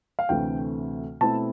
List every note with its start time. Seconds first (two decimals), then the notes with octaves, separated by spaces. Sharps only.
0.19 F5
0.29 D2 C3 E3 A3 C4 G5
1.21 B2 A3 C4 E4 A5